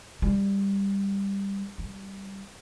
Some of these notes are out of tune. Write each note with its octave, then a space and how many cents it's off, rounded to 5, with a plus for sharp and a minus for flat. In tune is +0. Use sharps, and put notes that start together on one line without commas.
G3 +15
G3 -5